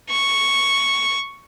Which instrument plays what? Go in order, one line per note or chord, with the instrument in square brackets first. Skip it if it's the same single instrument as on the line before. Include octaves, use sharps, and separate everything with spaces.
[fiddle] C#6